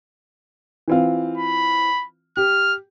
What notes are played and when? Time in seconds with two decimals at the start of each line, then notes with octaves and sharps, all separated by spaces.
0.88 E3 C4 F4
1.38 B5
2.37 G4 F6